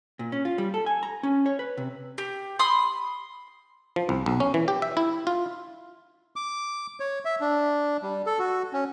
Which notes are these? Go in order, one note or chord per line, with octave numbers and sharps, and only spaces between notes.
A#2
C#4
F4
G3
A4
G#5
A#5
C#4
C#5
B4
C3
G4
B5 C6 D#6
F3
C2
B1
C#4
E3
G4
E5
E4
F4
D6
C#5
E5
D4
G3
A4
F#4
C#4